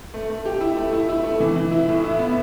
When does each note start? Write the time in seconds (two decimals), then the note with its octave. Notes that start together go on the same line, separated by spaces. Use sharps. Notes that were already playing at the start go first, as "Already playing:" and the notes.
0.14 A3
0.30 A3
0.45 G4
0.61 E4
0.77 A3
0.93 E4
1.09 E4
1.24 A3
1.40 E3
1.56 E3
1.71 E4
1.88 A2
2.04 E4
2.19 B3